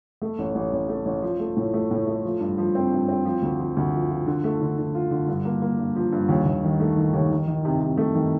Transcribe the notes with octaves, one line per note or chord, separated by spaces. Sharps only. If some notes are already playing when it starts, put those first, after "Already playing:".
A3
A1
A1
A1
A3
A1
F3
A3
A2
A3
A2
A3
F3
G2
F3
C4
G2
C4
F3
D2
F3
D2
F3
F3
D3
A3
D3
D3
F4
D3
G2
A#3
A#3
G2
F3
G2
D#2
D#2
D#3
A3
D#3
D#2
D#3
D#3
C3
C3
A3
D#3